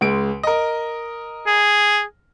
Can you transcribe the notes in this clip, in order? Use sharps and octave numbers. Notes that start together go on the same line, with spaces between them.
C#2 G#3 D7
A#4 D#5
G#4